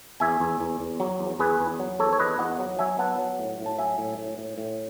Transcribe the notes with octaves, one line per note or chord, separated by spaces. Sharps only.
E2 E5 G#5
E2
E2
E2
F#3
E2
E2 G#4 B4
E2
F#3
E2 A4 C#5
C#5
E2 B4 D#5
E2 D#5 F#5
F#3
F#3 E5 G#5
B3 F#5 A5
F#3
A2
A2
A5
F#3 E5 G#5
A2
A2
A2
A2